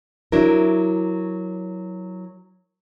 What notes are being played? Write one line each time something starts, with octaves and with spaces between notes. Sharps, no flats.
F#3 D4 E4 A#4